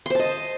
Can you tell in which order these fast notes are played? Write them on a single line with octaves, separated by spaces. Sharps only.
C6 C5 A5 D#5